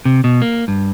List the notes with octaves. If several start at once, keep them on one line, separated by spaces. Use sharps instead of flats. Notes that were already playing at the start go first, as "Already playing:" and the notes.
C3
B2
A#3
G2